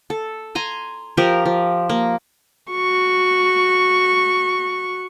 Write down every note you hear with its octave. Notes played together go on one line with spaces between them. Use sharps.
A4
G#5 A#5 C6
F3 G4 A#4
F3
A#3
F#4 C#6